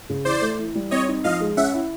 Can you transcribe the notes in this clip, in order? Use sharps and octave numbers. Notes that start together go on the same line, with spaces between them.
C#3
E3 C5 D5
A3
E3
G3
C4 C#5 D#5
D#4
F3 D#5 F5
G#3
C#4 E5 F#5
E4